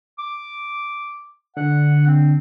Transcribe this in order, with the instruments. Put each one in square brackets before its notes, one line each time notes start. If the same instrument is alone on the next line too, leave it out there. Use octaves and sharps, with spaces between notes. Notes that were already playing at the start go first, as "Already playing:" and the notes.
[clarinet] D6
[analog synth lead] D3 [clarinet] F#5
[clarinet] C4